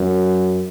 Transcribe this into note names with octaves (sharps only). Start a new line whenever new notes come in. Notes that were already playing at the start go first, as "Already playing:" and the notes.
Already playing: F#2